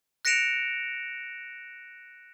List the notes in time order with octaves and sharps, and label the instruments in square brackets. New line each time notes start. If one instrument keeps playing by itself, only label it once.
[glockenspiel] F#6 A#6 C#7 D7 E7 F7